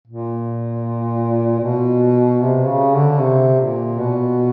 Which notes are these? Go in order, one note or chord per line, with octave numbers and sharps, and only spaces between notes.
A#2
A#2
B2
C3
C#3
D3
C3
A#2
B2